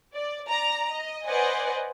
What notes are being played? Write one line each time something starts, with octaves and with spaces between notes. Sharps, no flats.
D5
D5 A#5
D#5
B4 C5 D5 D#5 F#5 G#5